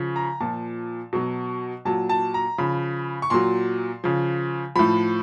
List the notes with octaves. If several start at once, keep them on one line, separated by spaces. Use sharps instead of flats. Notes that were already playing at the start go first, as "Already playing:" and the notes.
Already playing: C#3 F3
A#5
A#2 F3 A5
B2 F#3
A#2 F#3 A5
A5
A#5
C#3 F3 B5
C#6
A#2 F#3 C6
C#3 F3
A2 F3 B5